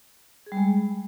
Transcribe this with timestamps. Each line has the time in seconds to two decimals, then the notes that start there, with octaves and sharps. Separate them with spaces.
0.46 G#4
0.52 G3
0.57 G#3